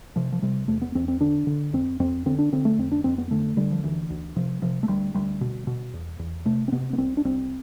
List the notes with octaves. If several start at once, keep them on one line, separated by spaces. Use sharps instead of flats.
C3 F3
F3
C3 G3
E2 A3
B3
E2 C4
C4
D3 D4
D3
F2 C4
F2 C4
D3 C4
D4
D3 C4
A3
F2 C4
D4
F2 C4
B3
D3 A3
D3 G3
F3
D2 E3
D2
C3 F3
C3 F3
A3
D2 G3
D2 G3
B2
B2
E2
E2
C3 A3
C4
C3 B3
B3
C2 C4
D4
C2 C4